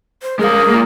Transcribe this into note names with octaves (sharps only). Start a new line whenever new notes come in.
C5
G#3 G#4 A#4 F5
A#3 F4